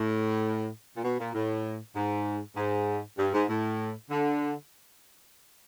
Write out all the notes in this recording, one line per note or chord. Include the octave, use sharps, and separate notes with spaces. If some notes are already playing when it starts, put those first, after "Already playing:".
Already playing: A2
A#2
B2
A#2
A2
G#2
G#2
G2
G#2
A2
D3